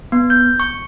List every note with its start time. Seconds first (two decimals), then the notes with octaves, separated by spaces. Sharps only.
0.12 B3
0.30 G6
0.60 C#6